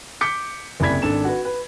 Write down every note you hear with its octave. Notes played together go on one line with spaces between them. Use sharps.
D6 G6 B6 C#7
F#1 C2 D5 B5 G#6 B6
G#1 D4 A4 E7
F#4 B4
B4